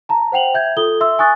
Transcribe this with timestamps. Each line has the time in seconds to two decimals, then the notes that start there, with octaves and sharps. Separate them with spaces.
0.09 A5 A#5
0.32 C5 F#5 G5 F7 F#7
0.54 E5 G6 G#6
0.77 F4 A4 D#6 G7
1.01 E5 C6 E6
1.19 G#5 C#6 D#6 F#6 A6